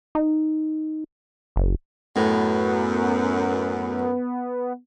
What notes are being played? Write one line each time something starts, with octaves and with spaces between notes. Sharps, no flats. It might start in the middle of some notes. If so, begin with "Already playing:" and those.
D#4
F#1
F#2 A2 B3